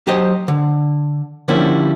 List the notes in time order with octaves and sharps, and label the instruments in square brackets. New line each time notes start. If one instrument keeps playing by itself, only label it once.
[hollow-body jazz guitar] F#3 G4 C5 D#5
D3
D3 F3 G3 A#3 C#4 E4